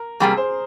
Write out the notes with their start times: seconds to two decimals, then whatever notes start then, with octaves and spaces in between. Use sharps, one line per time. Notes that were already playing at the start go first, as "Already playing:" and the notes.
Already playing: A#4
0.20 C3 G3 A#3 G#4
0.37 C5